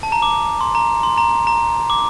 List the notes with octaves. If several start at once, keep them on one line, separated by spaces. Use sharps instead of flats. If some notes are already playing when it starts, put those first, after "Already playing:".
A5
A#5
D6
C6
A#5
C6
A#5
A#5
D6